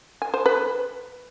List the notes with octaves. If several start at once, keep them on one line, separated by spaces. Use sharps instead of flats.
G#5
C5
B4